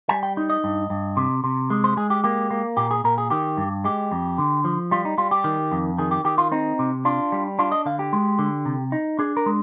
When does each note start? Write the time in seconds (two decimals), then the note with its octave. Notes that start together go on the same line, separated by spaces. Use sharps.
0.09 G3 G#5
0.23 G5
0.37 D#4
0.50 D#5
0.64 G2
0.90 G2
1.17 C3
1.44 C3
1.70 G#3
1.84 C5
1.97 G#3 G#4
2.10 G4
2.24 A#3 G4
2.51 A#3
2.77 A#2 G4
2.91 G#4
3.04 A#2 A#4
3.18 G#4
3.30 D#3 G4
3.57 G2
3.84 G#3 G4
4.12 F2
4.38 D3
4.65 F3
4.91 G3 F4
5.05 D#4
5.18 G3 F4
5.31 G4
5.44 D#3
5.72 F2
5.98 D#3 G#4
6.11 G4
6.25 D#3 G4
6.38 F4
6.52 C4 D#4
6.79 C3
7.05 D4 F4
7.32 G3
7.59 D4 F4
7.72 D#5
7.86 D3 F5
7.99 G4
8.13 G#3
8.39 D3
8.66 C3
8.92 D#4
9.19 D4 G#4
9.37 A#4
9.46 G#3